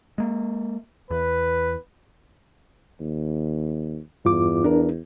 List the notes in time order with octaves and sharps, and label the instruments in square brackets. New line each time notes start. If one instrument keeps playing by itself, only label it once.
[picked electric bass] G#3 A#3
[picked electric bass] E2 [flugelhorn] B4
[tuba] D#2
[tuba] E2 [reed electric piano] G2 F4 D6
[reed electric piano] D4 A#4